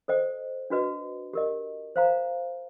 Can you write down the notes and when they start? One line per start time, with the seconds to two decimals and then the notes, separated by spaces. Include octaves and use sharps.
0.08 A4 C5 D#5 G5
0.70 D4 F#4 B4 D#5
1.33 G4 A#4 D#5
1.96 C5 F5 A#5